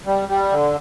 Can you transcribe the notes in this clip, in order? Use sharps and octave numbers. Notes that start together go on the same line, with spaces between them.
G3
G3
D3